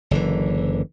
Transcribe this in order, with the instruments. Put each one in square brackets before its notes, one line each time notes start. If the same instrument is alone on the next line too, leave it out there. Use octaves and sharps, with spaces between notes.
[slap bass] F#1 D3 E3